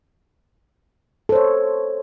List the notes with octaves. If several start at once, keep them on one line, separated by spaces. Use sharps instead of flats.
A4 C5 C#5